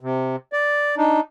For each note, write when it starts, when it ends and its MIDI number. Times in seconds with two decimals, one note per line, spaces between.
0.01 0.36 48
0.53 0.95 74
0.98 1.20 62
0.98 1.20 63